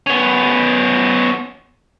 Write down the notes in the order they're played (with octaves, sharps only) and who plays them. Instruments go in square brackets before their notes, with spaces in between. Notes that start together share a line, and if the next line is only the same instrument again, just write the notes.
[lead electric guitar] B3 C#4